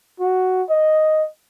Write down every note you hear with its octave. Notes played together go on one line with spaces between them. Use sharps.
F#4
D#5